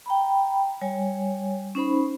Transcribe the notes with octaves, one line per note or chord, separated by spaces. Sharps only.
G5 A#5 B5
G3 C#5 G#5
C#4 D#4 C5 B5